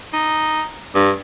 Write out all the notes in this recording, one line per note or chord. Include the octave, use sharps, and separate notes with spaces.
D#4
G2